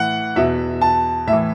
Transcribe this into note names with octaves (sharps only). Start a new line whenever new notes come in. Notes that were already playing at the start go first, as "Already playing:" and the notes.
Already playing: A2 E3 F#5
E2 B2 E5
A5
A2 E5
E3